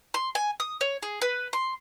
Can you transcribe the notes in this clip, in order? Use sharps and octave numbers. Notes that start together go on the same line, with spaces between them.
C6
G#5
D#6
C#5
G#4
B4
C6